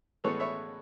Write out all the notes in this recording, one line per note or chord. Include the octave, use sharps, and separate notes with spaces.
A2 E3 G#3 B3 A4 C#5
C#5 E5